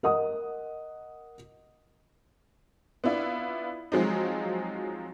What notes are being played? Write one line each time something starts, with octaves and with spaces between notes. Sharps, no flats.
A#4 D#5 F#5 D#6
B3 D4 E4 F4
F3 F#3 G#3 C4 D#4